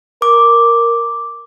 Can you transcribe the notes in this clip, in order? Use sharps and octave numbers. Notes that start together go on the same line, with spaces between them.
A#4 D6